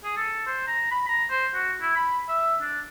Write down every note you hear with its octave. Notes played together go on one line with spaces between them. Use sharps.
G#4
A4
C5
A#5
B5
A#5
C5
F#4
E4
B5
E5
D4